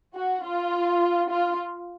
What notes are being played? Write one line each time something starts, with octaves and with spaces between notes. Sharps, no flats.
F#4
F4
F4